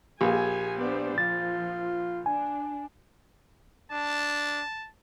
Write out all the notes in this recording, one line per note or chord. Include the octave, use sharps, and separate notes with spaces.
A#1 G4 G#4 G#5
B3 D4 C5 D5
F3 F4 A6
D4 G#5
D4 A5